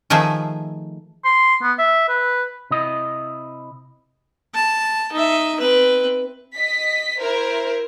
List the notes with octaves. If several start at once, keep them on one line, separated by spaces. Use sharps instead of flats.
D#3 F3 A3 G#4 E5
C6
B3
E5
B4
C3 E4 D#5
A5
D#4 E5
C4 B4
D#5 B6
E4 A#4 C5